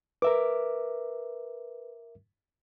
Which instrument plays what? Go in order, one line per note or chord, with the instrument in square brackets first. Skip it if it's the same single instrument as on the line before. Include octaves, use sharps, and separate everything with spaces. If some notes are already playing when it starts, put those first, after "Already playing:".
[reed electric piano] A#4 E5 D6 [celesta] B4